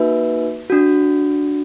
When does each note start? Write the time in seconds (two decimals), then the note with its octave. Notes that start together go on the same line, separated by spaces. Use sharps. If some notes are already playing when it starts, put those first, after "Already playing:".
Already playing: A#3 D#4 F#4 B4 E5
0.70 D4 F#4